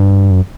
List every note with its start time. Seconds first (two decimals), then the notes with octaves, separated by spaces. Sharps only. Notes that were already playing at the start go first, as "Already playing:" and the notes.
Already playing: G2
0.31 F#2